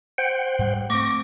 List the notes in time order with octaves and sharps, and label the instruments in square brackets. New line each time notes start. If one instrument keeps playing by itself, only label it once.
[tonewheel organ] C5 F#5 G5
[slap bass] G#2 G3
[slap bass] A3 C4 [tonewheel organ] C#6 A#6 [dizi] D6